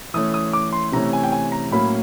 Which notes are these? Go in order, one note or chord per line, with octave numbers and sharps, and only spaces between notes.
E3 A3 C#4 D#6
D#6
D6
C6
C3 E3 A3 C#4 A#5
G#5
G5
G#5
A#5
A2 F#3 A#3 C#4 B5